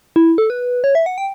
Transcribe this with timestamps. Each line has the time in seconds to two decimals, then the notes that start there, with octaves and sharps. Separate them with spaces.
0.16 E4
0.38 A4
0.50 B4
0.84 C#5
0.95 E5
1.06 F#5
1.18 G5